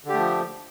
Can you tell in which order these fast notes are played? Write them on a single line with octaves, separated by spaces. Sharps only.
D3 G4 A3 F3